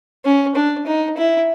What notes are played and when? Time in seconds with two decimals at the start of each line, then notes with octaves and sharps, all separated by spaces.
0.25 C#4
0.55 D4
0.86 D#4
1.17 E4